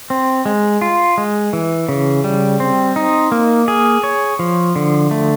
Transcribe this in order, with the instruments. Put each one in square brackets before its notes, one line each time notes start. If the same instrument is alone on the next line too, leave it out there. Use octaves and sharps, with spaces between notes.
[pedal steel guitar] C4
G#3
F4
G#3
E3
C#3
G3
C4
D#4
A#3
G#4
C#5
F3
D3
A3